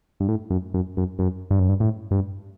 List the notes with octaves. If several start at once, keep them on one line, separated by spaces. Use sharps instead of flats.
G2
A2
F#2
F#2
F#2
F#2
G2
F#2
G2
A2
G2